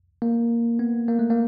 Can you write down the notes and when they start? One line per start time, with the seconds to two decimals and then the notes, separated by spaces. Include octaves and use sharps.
0.22 A#3
0.79 B3
1.08 A#3
1.19 A3
1.30 A#3